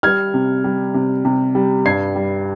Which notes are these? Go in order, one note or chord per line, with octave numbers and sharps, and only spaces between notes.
G3 F6 G#6
C3
G3
C3
C3
G3
G2 G#6 C7
G3